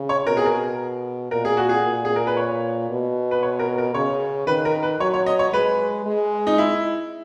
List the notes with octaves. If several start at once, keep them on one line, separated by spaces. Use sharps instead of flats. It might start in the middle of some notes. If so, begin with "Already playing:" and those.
Already playing: C#3
C#5
B2 A#4
G#4
A#4
A#2 A#4
G#4
F#4
G#4
A#2
G#4
A#4
B4
C#5
B2
B4
C#5
A#4
A#4
C#3 C#5
D#3 B4
A#4
B4
F#3 C#5
C#5
D#5
C#5
G#3 B4
G#3
D#4
E4